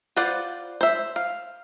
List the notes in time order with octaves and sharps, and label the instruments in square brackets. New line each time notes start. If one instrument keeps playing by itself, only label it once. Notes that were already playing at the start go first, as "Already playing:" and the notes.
[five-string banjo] F4 B4 C5 D5 F#5
C5 E5
F5